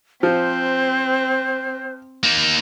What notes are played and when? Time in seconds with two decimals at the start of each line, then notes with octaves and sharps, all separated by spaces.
0.23 F3 C4 C5
2.23 A#3 D#4